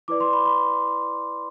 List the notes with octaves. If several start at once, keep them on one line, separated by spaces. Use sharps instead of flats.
E4 B4 D5 D6
C6
B5
B5